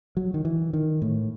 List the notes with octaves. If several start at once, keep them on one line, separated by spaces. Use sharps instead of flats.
F#3
D#3
E3
D#3
A2